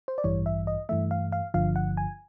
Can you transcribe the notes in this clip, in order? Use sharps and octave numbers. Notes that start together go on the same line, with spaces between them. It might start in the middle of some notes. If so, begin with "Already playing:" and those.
C5
D5
A1 G2 E3 G3 C#5
E5
D#5
G2 E3 A3 E5
F5
F5
G1 G2 D3 F3 F5
F#5
G#5